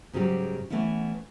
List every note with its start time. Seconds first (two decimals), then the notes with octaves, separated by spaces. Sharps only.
0.13 G#2 C#3 F#3 G3 G4
0.70 E3 A3 B3 C#4 E4